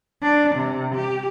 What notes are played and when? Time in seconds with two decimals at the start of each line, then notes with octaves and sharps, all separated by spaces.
0.22 D4
0.56 C3
0.95 G4